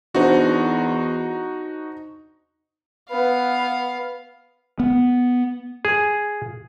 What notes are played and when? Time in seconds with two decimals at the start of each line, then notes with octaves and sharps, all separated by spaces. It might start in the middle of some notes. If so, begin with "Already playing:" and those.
0.15 E2 D4 D#4 F#4 C5
3.09 B3 F5
4.80 B3
5.85 G#4